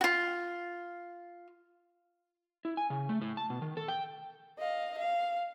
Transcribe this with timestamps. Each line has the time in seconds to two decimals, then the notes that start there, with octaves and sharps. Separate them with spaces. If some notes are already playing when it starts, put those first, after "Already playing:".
0.01 F4 F#4
2.65 E4
2.77 G#5
2.90 C#3
3.09 A3
3.22 A2
3.37 A5
3.50 B2
3.62 D#3
3.77 A4
3.88 G5
4.58 D#5 F5
4.98 F5